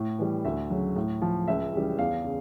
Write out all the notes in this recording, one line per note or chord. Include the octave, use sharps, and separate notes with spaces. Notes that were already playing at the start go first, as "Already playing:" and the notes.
Already playing: A2
E3 G3
D2 E5
C#3 F#3
A2
F3
C#2 E5
C#3 E3 G3
E2 F5
C#3